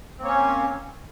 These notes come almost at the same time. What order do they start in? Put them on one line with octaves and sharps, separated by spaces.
C4 A#3 C#5 C#4